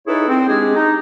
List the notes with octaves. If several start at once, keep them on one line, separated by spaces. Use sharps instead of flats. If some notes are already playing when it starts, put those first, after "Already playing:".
D#4 E4 G#4 A4 B4 C#5
C4
G#3 C4 D4 G4 G#4
D#4